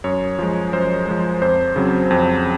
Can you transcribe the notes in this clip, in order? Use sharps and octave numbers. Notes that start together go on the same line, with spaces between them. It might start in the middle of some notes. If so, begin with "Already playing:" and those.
F#2 C#5
F3 G#3
F#2 C5
F3 G#3
F2 C5
C#3 F#3 C4
F2